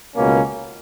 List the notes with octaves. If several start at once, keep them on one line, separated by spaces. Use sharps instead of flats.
C#2 B2 A#3 C#4